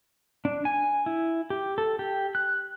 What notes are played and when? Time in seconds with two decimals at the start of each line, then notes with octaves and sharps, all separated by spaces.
0.45 D4
0.65 G#5
1.06 E4
1.50 G4
1.78 A4
1.99 G4
2.35 F#6